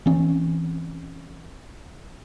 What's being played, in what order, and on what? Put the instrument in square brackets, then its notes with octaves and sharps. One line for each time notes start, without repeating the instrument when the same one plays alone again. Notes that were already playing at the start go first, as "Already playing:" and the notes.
[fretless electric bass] E3 C4 C#4